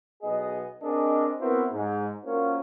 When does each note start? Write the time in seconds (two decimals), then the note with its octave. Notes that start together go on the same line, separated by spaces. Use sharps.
0.23 B1 B3 G#4 D#5
0.82 C4 D4 G#4 A#4 D#5
1.40 B3 C4 E4 F#4 A#4 B4
1.72 G#2
2.25 A#3 C#4 F4 F#4 A#4 C5